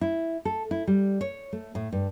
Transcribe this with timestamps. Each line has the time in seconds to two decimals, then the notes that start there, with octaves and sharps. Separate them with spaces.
0.01 E4
0.45 A4
0.71 E4
0.87 G3
1.21 C#5
1.53 A3
1.75 A2
1.92 G2